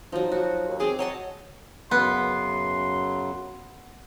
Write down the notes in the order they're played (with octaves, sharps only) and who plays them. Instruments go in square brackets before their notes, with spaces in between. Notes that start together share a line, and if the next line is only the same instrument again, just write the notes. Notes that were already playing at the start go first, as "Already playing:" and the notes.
[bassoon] F3 [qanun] F#3 D#4
[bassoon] F3 [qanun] F#4
[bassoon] D#2
[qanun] C4 C6 D6 [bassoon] G#4
[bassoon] F#3 [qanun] C#5 D#5 A5
[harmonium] F#2 C#3 F#3 [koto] B3 [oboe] C6